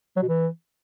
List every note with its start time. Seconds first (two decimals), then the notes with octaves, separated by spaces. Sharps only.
0.16 F#3
0.22 B2
0.28 E3